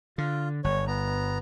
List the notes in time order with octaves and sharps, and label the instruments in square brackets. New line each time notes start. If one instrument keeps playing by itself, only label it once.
[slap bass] D3 [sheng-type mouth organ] F4
[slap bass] G1 [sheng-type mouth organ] C#5
[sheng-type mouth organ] B3 A#5